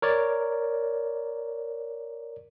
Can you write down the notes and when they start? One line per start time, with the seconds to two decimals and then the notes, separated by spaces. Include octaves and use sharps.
0.02 A#4 C#5 D5